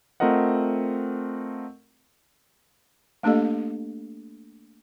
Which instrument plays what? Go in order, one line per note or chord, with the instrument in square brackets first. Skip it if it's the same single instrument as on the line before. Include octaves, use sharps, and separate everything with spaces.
[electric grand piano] A3 C4 F4 A#4 D#5 F#5
[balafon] A3 A#3 D4 G4 A4 D#5